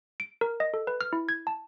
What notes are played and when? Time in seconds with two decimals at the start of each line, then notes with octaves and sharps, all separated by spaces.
0.20 D7
0.41 A#4
0.60 D#5
0.74 A4
0.87 B4
1.01 F6
1.13 E4
1.29 G#6
1.47 A5